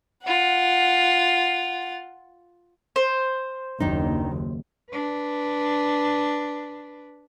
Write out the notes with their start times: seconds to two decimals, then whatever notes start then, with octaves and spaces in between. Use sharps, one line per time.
0.24 F4 F#5
2.96 C5
3.80 F#1 D#2 D#3 D4 D#4
4.91 D4 B4